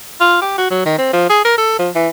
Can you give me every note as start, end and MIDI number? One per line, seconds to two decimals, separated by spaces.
0.21 0.40 65
0.42 0.54 67
0.58 0.67 66
0.71 0.84 54
0.86 0.95 51
0.98 1.08 60
1.13 1.25 53
1.30 1.42 68
1.45 1.55 70
1.58 1.79 69
1.79 1.90 53
1.95 2.09 52